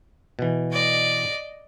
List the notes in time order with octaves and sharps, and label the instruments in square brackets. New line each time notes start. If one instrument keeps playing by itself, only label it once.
[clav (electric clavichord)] B2 E3
[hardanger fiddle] D5 D#5